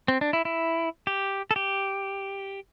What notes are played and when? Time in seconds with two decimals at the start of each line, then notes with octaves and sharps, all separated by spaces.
0.08 C4
0.21 D4
0.33 E4
0.45 E4
1.07 G4
1.51 A4
1.56 G4